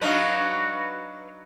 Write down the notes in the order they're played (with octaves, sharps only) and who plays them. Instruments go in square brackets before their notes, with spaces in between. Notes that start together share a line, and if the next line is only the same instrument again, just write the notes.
[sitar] F#3 D4 D#4 [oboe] F#4 [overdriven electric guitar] B4 F5